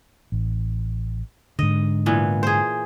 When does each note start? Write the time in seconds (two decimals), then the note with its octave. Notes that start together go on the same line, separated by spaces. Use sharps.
0.32 A1
1.59 G#2 D3 D#5
2.06 A#2 E3 B3
2.43 G#4 C5